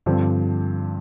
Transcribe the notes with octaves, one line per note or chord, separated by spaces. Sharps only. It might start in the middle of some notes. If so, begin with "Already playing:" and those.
G2 D3 F3 C4